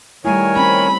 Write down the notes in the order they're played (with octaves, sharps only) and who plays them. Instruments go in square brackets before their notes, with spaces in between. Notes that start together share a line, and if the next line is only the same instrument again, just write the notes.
[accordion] D#3 A#4 C#5 [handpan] G3 A3 E4 [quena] G#5
[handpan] C4 C#4 [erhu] B5